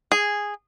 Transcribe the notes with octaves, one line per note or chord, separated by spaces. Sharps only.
G#4